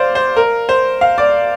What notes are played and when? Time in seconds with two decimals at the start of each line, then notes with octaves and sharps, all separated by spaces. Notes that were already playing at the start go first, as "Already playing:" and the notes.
Already playing: C5 D5 F5
0.15 C5
0.36 A#4
0.69 C5
1.01 F5
1.18 D5